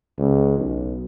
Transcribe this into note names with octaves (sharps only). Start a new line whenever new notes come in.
C#2
B1